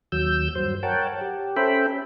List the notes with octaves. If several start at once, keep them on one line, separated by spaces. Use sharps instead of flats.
D#2 F#3 E6 G6
G2 F#3 C5
A#4 C#5 F#5 G5 A5
G4
C#4 A4 C5 E5 G5 B5